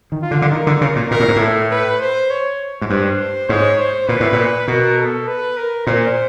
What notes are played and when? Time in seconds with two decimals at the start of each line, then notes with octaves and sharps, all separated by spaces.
0.12 D#3
0.22 F4
0.31 D3
0.42 D3
0.51 D#3 A#4
0.67 D3
0.81 C#3 A#4
0.96 A#2
1.10 A#2 A#4
1.20 A2
1.28 G#2
1.36 A2 A4
1.71 B4
2.00 C5
2.30 C#5
2.81 G#2
2.90 G2 C5
3.49 G#2 C#5
3.79 C5
4.08 A#2 B4
4.20 A2
4.32 A#2
4.68 B2 A#4
4.98 A4
5.27 B4
5.57 A#4
5.87 A#2 C5